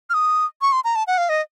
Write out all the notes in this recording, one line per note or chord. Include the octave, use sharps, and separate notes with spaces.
F6
D#6
C#6
C6
A#5
A5
F#5
F5
D#5